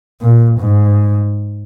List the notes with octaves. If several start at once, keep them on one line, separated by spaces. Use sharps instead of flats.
A#2
G#2